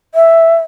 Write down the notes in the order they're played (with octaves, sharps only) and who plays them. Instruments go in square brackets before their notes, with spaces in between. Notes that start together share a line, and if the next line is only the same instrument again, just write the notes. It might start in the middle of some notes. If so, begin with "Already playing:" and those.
[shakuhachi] E5